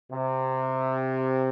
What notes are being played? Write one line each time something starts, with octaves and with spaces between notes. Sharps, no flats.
C3